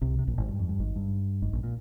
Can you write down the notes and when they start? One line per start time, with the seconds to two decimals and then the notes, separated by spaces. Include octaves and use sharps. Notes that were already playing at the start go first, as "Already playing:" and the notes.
0.01 C2 C3
0.19 C3
0.27 A#1 A#2
0.38 G#1 G#2
0.48 G2
0.59 F2
0.69 G2
0.79 G#1 G#2
0.96 G2
1.42 G#1 G#2
1.53 A#1 A#2
1.63 A#2